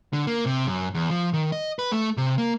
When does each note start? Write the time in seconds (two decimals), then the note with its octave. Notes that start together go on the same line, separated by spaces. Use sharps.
0.13 D3
0.27 A#3
0.46 C3
0.66 F#2
0.94 E2
1.10 F3
1.33 D#3
1.52 D#5
1.79 B4
1.92 A3
2.17 C3
2.38 A#3